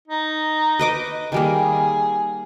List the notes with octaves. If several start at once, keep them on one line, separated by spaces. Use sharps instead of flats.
D#4
B4 D#5 D6
D#3 G3 A#3 G#4